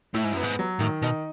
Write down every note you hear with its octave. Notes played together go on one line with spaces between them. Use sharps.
A2 E4
G#2
F#2 B3
G#2
F#3
A2 D#3
B2 D#4